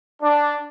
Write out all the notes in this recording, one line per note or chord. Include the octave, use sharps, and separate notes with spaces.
D4